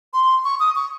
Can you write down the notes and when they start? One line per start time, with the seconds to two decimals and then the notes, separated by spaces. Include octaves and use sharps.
0.14 C6
0.45 C#6
0.60 D#6
0.76 C#6